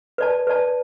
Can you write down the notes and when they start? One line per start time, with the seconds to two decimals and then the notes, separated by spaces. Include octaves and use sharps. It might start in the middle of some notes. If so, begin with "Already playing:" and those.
0.18 B4 D5 A5
0.47 B4 D5 A5